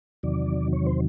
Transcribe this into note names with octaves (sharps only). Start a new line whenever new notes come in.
E2 C3 D#3 F#3 D5
C#5
C5